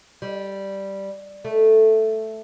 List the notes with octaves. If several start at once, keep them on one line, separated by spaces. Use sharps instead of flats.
G3
A3